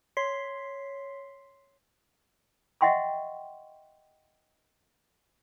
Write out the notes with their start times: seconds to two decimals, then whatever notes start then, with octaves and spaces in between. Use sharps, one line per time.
0.17 C#5 C6 B6 C7
2.81 D#5 E5 F#5 G5 C6 C#6